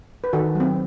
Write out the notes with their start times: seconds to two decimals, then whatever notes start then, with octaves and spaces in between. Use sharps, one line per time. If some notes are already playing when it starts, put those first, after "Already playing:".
0.24 B4
0.33 D#3 F#4 A4
0.55 F#3
0.60 C4